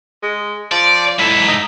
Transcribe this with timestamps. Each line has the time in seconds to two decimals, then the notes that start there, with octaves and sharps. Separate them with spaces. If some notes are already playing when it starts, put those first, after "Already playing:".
0.23 G#3
0.72 F3 D5
1.19 G#2 E4 A4
1.48 D#4